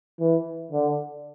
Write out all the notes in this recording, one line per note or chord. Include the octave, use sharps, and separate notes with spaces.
E3
D3